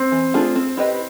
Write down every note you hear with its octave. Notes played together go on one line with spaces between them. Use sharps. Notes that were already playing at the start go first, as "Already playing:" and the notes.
Already playing: C4
E3
A3 D4 F4 G#4
C4
E4 G4 B4 D#5